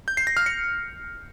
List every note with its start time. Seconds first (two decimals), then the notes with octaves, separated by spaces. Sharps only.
0.08 G6
0.17 C7
0.27 A#6
0.37 F6
0.46 C#7